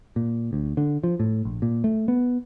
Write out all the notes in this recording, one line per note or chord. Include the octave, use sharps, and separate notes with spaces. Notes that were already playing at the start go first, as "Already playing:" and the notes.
A#2
D2
D3
F3
A2
A#1
A#2
A3
B3